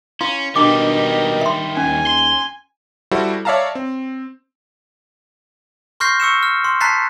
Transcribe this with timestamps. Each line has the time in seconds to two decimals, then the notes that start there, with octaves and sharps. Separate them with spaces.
0.21 C#4 E4 F5 C6
0.56 B2 D#3 G3 D4 G4 A#4 D#5 D6
1.41 E5 C6
1.77 D#2 C#4 G#5
2.07 C6
3.11 G3 E4 F#4 A4 C5
3.45 C#5 D5 E5 F5 A5 A#5
3.75 C4
6.00 C6 C#6 F6 G6 A#6 C7
6.20 C#6 E6 C#7 E7
6.43 F6
6.64 C6
6.81 A5 A#5 F#6 A6 B6 C7